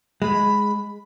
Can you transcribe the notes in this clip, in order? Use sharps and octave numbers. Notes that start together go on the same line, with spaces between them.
G#3 B5